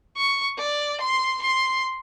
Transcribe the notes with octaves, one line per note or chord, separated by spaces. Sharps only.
C#6
D5
C6
C6